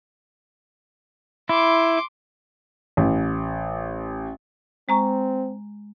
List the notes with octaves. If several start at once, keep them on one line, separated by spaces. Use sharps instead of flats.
E4 C6 D6
A1
G#3 C4 A#5 C#6